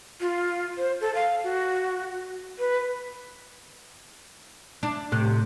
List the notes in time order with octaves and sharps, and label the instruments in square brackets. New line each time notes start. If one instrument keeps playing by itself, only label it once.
[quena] F4
C5
A4
F5
F#4
B4
[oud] D4
[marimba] A2 A3 F#6 [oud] C3